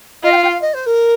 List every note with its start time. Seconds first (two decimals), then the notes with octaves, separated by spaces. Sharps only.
0.23 F4 D#5
0.32 G5
0.36 F5
0.44 G5
0.48 F5
0.61 D#5
0.73 C5
0.86 A#4